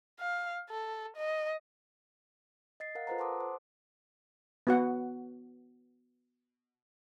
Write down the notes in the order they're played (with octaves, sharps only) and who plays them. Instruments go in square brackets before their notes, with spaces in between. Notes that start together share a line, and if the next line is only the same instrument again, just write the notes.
[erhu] F5
A4
D#5
[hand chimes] D#5 A6 C7
A#4 F5 F#5
F4 A4 B4 C5 F#5 A#5
F#5 A5 C6 D6 D#6
C5
[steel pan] B3 F#4 F#5